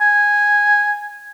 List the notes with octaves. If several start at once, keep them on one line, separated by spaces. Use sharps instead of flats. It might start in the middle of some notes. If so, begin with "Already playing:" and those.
G#5